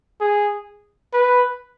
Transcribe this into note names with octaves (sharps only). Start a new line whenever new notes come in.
G#4
B4